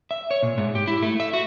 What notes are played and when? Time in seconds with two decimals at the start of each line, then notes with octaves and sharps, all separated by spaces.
0.11 E5
0.31 C#5
0.43 A#2
0.58 G#2
0.75 G4
0.88 E4
1.03 A3
1.20 E5
1.33 F#4